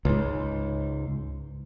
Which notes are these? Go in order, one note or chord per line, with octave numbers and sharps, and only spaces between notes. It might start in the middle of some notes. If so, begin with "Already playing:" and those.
C#2 G#2